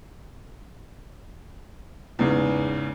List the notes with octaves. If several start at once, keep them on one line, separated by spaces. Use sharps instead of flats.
E2 G#2 C#3